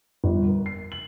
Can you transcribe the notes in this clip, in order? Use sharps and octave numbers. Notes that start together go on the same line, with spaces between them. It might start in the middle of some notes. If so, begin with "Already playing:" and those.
G1
A#4
C7
F#7